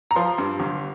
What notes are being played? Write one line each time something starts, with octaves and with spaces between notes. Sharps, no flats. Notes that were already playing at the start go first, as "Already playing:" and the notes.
A#5
F3 C6
G2
G1